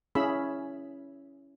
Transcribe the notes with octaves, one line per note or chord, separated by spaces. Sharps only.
C#4 E4 G#4 B5 E6